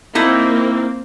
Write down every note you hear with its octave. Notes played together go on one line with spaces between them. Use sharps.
A#3 C4 D#4 E4